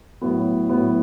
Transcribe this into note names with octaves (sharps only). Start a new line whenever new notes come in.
A2 F#3 B3
A2 F#3 B3